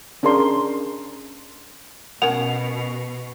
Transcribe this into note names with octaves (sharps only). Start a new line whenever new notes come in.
C#4 D4 G#4 A#4 C6
B2 C#4 A#4 F#5 F7